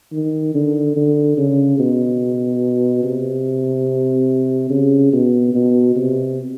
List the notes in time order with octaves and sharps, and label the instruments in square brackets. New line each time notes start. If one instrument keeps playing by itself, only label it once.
[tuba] D#3
D3
D3
C#3
B2
C3
C#3
B2
B2
C3